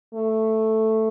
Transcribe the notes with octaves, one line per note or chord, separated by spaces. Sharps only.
A3